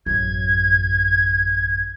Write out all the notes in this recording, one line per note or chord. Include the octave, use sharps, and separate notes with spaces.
A1 F#2 G#6